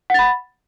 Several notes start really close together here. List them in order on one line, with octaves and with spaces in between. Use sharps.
F#5 A6 B5